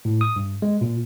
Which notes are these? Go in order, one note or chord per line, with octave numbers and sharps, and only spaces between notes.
A2
D#6
G2
G#3
A#2